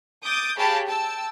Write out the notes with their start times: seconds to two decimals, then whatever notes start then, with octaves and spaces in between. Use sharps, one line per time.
0.24 D6 D#6 G6 A6
0.57 G4 G#4 C#5 F5 A5 B5
0.86 G5 A5 E6